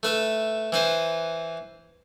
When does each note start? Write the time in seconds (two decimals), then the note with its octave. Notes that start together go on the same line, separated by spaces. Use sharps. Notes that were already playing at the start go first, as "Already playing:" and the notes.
0.03 A3 B4 E5
0.72 E3 B4 C5